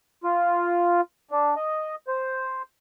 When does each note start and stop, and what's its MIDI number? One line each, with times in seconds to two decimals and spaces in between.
0.24 1.01 65
1.31 1.54 62
1.56 1.95 75
2.08 2.62 72